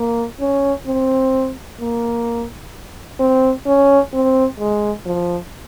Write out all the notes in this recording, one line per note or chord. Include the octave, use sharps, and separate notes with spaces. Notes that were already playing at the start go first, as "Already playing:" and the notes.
Already playing: A#3
C#4
C4
A#3
C4
C#4
C4
G#3
F3